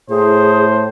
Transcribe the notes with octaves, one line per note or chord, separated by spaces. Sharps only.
A2 G#4 C5